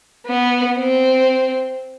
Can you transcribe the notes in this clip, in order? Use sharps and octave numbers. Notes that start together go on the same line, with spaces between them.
B3
C4